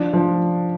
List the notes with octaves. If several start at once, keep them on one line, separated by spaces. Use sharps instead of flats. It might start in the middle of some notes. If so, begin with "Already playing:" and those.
Already playing: F3 D4
F3